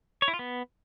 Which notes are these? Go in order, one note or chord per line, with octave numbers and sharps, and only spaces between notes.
C#5
E4
F4
B3